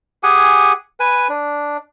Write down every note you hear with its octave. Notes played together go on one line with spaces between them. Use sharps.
G4 G#4 F#5 G#5
B4 G#5
D4